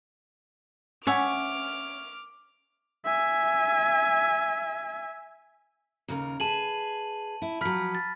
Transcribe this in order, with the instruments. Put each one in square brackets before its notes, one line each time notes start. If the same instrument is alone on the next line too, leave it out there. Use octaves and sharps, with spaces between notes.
[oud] C#4 [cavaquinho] C#5 E5 F#5 [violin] D6 F6
[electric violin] E5 G#5
[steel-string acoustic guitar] D#2 C#3 A#4
[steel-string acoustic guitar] G#4 B4 [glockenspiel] A5 D#7 F#7
[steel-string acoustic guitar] E4
[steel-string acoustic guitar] F3 F#3 [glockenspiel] B5 F6 B6
[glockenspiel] A6